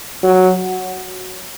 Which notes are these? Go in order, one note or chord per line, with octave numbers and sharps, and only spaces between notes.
F#3